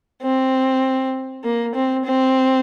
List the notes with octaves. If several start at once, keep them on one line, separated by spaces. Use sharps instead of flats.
C4
A#3
C4
C4